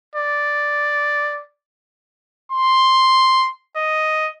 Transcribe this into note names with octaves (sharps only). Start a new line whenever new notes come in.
D5
C6
D#5